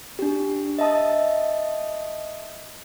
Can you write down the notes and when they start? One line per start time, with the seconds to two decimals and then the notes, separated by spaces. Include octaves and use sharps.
0.19 D4 G4
0.79 D#5 E5 A5 D#6